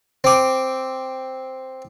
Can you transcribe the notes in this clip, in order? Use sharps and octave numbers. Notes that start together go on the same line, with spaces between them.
C4 D6